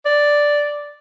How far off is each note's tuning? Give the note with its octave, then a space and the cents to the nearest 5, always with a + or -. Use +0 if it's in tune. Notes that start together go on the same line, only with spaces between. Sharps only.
D5 +0